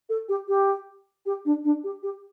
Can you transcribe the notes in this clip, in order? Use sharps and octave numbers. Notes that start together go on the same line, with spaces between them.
A4
G4
G4
G4
D4
D4
G4
G4